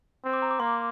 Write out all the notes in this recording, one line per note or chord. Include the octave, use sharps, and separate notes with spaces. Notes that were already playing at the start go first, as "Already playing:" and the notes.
C4
D6
A#5
D6
A#3 C6